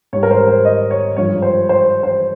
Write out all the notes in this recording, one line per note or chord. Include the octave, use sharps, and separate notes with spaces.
G#2 G3 C#5
A#4
C5
C5
D#5
C#5
G2 F3 G#3 C#5
C5
C5
C5